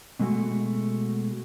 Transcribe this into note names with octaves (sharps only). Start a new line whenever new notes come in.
B2 G#3 A3 F#4